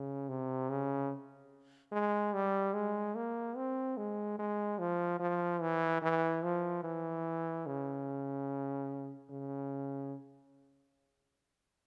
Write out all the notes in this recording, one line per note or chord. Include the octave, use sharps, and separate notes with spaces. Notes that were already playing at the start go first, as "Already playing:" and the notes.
Already playing: C#3
C3
C#3
G#3
G3
G#3
A#3
C4
G#3
G#3
F3
F3
E3
E3
F3
E3
C#3
C#3